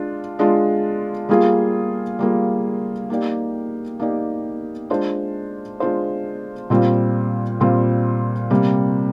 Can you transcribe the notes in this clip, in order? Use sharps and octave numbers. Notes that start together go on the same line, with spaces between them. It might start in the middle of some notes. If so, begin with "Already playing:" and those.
Already playing: G#3 D4 F4
G#3 D4 F4
G3 A#3 F4 G#4
G3 A#3 F4 G#4
A#3 D#4 G4 D5
A#3 D#4 G4 D5
G#3 D4 F4 C5
G#3 D4 F4 C5
A#2 G3 C4 F4
A#2 G3 C4 F4
C3 G3 A#3